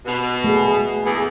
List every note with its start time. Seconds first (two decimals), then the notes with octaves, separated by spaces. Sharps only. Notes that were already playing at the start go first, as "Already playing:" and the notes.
0.06 B2
0.44 A3 G#4
1.05 E2